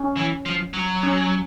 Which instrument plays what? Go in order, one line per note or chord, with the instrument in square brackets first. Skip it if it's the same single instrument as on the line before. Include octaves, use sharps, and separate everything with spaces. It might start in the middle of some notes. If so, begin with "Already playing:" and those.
Already playing: [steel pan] C#4
[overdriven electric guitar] E3
F3
F#3
[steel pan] C#4